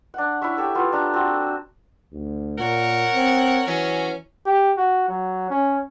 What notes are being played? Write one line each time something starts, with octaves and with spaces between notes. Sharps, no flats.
D4 F#5
E4 C#5 E5 C#6
G4 A4 C#5
B3 F4
D4 A4 A#5
C4 F#4
D2
A#2 A#4 C#5 F#5
C4
E3 F#3 C#4
G4
F#4
F#3
C#4